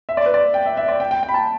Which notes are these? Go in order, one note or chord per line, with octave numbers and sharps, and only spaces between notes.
E5
D5
B4
D5
G5
E5
E5
D5
G5
G5
G5
B5
A5